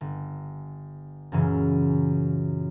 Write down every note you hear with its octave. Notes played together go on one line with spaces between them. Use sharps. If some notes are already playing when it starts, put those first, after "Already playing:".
G1
F#2 A#2 C#3 E3